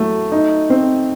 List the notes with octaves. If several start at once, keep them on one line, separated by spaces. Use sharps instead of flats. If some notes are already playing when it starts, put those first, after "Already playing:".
Already playing: F#3 A3 E4
D#4
C4